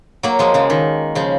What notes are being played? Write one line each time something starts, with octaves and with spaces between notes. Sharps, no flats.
F#3 A#3
F3 G#3
C#3 F3
D#3
C#3 F3